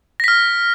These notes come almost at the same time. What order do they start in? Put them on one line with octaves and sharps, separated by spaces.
A#6 B6 F6